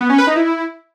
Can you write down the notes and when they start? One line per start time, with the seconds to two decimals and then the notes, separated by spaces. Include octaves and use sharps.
0.01 B3
0.09 C#4
0.18 B4
0.27 D#4
0.36 E4